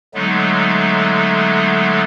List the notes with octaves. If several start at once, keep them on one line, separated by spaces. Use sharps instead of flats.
D3 F#3 G#3 A3 B3 D#4